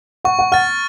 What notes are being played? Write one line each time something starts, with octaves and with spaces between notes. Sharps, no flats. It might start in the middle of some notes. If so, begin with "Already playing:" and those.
F#5 C#6
F#5
F#5 F6 A6